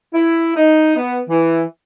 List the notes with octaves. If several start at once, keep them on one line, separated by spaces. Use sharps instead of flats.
E4
D#4
B3
E3